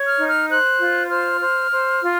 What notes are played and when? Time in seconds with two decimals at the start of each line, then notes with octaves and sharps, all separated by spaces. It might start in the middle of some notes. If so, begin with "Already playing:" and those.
Already playing: C#5
0.08 F6
0.18 D#4
0.29 F6
0.49 C5 F#6
0.80 F4
1.10 C5 F6
1.41 C5
1.71 C5
2.01 F4